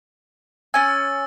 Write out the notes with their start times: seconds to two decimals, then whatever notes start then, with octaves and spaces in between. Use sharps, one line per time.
0.74 C#4 G#5 E6 A6